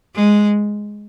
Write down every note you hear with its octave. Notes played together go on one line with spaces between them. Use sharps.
G#3